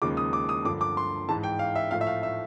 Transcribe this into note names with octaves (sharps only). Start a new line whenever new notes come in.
D#2 C#3 F3 G#3 D6
D#6
D6
D#6
G2 D3 F3 D6
D6
C6
G#2 E3 G#3 A5
G5
F5
E5
A2 F3 A3 F5
E5
F5
E5